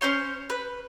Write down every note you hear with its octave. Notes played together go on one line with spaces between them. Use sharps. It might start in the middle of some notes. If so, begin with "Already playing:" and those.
C#4 E4 C5 C#5
B4